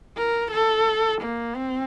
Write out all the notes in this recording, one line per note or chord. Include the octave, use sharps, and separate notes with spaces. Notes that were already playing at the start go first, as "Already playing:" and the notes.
A#4
A4
A#3
C4